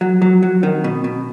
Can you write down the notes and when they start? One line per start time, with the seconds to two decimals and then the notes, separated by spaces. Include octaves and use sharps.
0.01 F#3
0.22 F#3
0.43 F#3
0.63 D#3
0.84 B2
1.04 B2